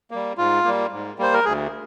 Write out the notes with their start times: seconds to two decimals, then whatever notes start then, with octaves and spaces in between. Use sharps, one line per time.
0.11 G3 A#3
0.38 G#2 F4
0.64 G3 A#3
0.92 G#2
1.19 G3 A#3 C5
1.33 A#4
1.45 D2 G#4